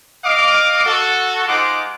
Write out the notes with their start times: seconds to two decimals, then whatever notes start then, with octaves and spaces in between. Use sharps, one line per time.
0.24 D#5 F5 D6
0.86 F#4 A4
1.48 G#3 D#4 F4 C5 F#5 D6